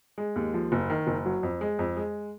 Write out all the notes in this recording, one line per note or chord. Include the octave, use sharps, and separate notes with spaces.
G#3
D#2
F3
F#1
D#3
F#1
F#3
F2
G#3
F2
G#3